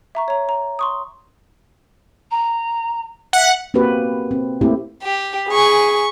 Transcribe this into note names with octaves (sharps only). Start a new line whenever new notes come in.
E5 A#5 C#6
C#5 A#5
A#5
C6 C#6 D#6
A#5
E5 F#5
A#3 C4 F#4 G4 B4
C4
A3 A#3 C4 E4 G4
G4
G#4 G#5 B5 C#6